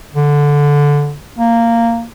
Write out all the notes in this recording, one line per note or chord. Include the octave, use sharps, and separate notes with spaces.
D3
A#3